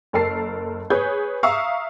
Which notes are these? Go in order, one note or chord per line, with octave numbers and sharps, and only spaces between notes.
F#1 A4 A#4 A5 C7
G#4 B4 C#5 G6
E5 F5 A#5 C#6 D#6 E6